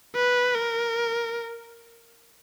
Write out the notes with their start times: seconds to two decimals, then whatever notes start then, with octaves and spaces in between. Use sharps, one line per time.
0.15 B4
0.55 A#4